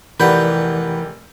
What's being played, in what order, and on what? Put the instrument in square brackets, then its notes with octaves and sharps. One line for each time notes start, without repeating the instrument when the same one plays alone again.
[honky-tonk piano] F1 G4 G6 [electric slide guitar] E3 [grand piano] A#4 D5 [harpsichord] B4 F#5